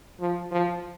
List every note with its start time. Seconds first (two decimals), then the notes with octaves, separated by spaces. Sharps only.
0.20 F3
0.52 F3